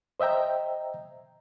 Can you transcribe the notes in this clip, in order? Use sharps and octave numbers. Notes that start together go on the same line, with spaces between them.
C5 D#5 E5 G5 A#5